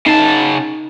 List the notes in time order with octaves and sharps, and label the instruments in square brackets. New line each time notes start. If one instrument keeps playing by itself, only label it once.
[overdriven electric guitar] C#3 A5 [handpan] D#4